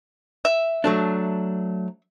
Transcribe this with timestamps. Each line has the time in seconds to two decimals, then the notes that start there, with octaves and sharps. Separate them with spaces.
0.45 E5
0.84 F#3 A3 D4